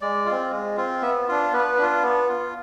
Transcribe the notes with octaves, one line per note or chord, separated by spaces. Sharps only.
G#3 D5
F4
C4
G#3
C4 F4
B3 E5
D4 F4
B3 B4
D4 F4
B3
F4